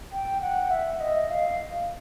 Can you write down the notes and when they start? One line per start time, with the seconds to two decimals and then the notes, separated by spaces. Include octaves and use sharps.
0.12 G5
0.42 F#5
0.71 E5
1.00 D#5
1.29 F5